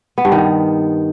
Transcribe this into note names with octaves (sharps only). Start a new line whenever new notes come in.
B3
G2
D#3